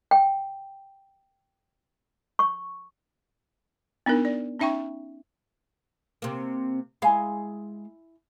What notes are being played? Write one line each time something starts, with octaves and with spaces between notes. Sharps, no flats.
G5
C#6
B3 D4 D#4 A#4
D5
C#4 D#4 E5 G5 C#6
C3 A#3
G#3 E4 F5 G#5 B5